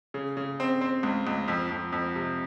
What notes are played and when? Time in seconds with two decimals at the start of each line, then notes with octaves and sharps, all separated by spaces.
0.14 C#3
0.37 C#3
0.60 C4
0.81 C4
1.03 C#2
1.27 C#2
1.48 F2
1.71 F2
1.92 F2
2.16 C3